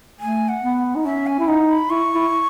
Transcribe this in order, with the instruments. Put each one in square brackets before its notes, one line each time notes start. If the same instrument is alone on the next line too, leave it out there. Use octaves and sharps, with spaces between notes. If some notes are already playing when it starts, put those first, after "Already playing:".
[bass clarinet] A3 [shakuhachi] G#5
[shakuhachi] F#5
[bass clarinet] B3
D#4
[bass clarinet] C#4 [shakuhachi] E5
[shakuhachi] G#5
[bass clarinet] E4
[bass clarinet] D#4 [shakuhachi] F#5
[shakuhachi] B5
[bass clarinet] E4 [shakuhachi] C#6
[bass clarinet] E4